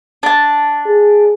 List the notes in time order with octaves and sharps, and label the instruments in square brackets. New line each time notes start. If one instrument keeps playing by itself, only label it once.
[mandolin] D4 A5
[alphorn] G#4